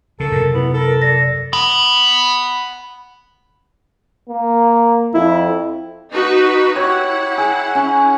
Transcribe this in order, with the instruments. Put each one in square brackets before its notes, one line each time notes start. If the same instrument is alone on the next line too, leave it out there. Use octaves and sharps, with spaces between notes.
[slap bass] C#3 [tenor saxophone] A4 [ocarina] A#4
[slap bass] F#2 C3
[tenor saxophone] B3 [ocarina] E4
[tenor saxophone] A4 [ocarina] A#4
[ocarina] D5 [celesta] A#6
[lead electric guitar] F#5 B5
[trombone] A#3
[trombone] F2 [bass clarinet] E4
[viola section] D#4 F#4 B4
[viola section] E4 F#5 [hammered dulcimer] G4 C#5
[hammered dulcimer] G#4
C#4